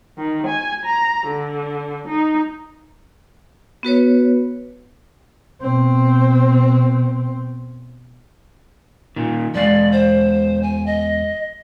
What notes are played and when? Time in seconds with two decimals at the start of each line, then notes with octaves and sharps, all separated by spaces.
0.17 D#3
0.48 G#5
0.85 A#5
1.27 D3
2.07 D#4
3.83 B3 F#4 B4 C#5
5.62 B2 C4
9.16 A#2 D#3
9.54 E2 G#3 D5 F5
9.92 C5
10.63 G#5
10.86 D#5